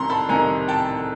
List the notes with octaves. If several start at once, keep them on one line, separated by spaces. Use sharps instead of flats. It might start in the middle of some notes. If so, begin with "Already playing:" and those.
Already playing: C2 C3 D#3 A#5 C6
A5 B5
C2 C3 D#3 G#5 A#5
G5 A5